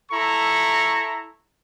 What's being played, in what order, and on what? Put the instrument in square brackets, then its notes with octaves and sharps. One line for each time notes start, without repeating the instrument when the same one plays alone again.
[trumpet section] E4 A4 A#5 C#6